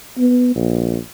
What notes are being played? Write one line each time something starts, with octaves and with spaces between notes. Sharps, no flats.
B3
A#1